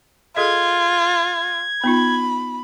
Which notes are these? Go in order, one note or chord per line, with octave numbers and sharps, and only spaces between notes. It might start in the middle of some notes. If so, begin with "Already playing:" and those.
F4 G#4 A4 D#5 G#6
B3 D#4 F4 B5